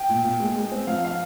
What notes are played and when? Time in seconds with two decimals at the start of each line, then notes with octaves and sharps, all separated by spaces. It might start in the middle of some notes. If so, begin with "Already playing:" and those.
Already playing: G5
0.09 A#2
0.24 A#2
0.40 G#3
0.56 G#3
0.72 C4
0.87 F3 F5
1.04 F5